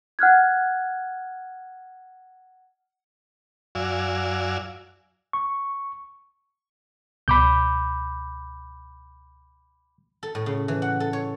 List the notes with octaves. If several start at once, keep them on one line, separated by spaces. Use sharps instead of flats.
F#5 F6 F#6 G#6
F#2 F#4 D5 F5 G#5 E6
C#6
C#2 B2 B5 D6 G6
A4
A2
C#3
E3
F#5
A4
C#5